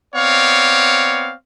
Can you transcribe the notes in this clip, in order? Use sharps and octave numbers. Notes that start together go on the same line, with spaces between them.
B3 C4 C#5 D5 F5